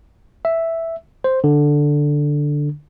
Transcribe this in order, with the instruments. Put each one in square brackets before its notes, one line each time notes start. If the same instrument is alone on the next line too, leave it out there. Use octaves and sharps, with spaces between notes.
[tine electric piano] E5
C5
D3